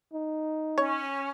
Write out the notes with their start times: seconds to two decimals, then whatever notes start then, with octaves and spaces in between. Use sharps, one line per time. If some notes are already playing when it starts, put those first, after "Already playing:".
0.13 D#4
0.78 C#4 C#5